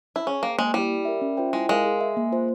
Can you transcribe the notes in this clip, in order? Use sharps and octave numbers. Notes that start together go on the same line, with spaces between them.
E4
C#4 G#4
A#3 C5 G5
G#3 A#3
G3 E4 G4
G4
A#4 E5
C#4
F4 C5 E5 G5
G#3 E4
G#3 A#4 F5 G#5
G#4
E5 G#5
A#3
F4 C5